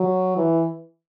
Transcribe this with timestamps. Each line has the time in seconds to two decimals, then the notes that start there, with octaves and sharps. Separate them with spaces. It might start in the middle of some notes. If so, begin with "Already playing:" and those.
Already playing: F#3
0.36 E3